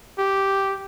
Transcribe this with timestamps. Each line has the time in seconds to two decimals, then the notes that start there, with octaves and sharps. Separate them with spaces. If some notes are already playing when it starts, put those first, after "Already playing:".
0.18 G4